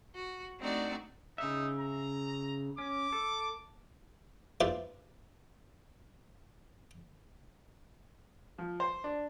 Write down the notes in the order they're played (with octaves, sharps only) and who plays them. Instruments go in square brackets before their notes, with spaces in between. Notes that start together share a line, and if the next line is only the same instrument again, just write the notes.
[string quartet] F#4
A3 C4 D4 D#4 F#4 D5
[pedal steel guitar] C#3 E5 [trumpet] D#4
[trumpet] A#5
[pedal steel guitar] C#4 [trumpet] D6
[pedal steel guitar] A4
[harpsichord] E4 F4 B4 C5 D5
[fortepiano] F3
C5
D4